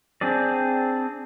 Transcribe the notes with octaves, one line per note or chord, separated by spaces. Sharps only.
C4 D4 G#4 D5